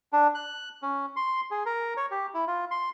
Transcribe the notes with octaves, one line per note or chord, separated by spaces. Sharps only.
D4
F#6
C#4
C6
G#4
A#4
C#5
G4
E4
F4
C6